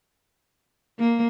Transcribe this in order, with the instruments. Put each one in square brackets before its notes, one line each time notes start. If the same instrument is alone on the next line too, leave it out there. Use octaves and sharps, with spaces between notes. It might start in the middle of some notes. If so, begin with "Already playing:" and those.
[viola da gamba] A#3